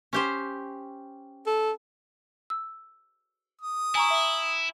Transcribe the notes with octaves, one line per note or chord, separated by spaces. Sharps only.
C#4 G4 C5
A4
E6
D#6
E4 G#5 A#5 C#6
E5